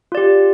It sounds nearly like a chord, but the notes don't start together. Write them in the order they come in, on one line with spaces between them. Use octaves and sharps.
F4 D5 G4